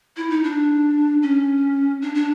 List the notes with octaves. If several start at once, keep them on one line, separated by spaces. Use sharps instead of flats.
E4
D#4
D4
C#4
D4
D4